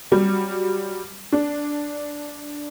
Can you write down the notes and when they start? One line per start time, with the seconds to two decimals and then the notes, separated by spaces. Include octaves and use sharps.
0.12 F#3 G3
1.32 D4